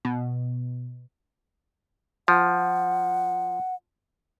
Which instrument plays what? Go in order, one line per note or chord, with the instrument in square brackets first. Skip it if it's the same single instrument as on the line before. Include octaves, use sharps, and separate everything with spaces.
[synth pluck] B2
[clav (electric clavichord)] F3 [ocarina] F#5